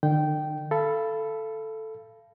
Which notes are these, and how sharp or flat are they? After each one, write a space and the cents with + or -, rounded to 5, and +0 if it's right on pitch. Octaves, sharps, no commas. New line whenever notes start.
D3 +45 G5 -15
A4 +0 F5 -35 B5 +0